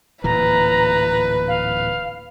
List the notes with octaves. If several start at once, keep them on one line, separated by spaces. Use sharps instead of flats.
D1 A#2 E3 B4 A#5
F5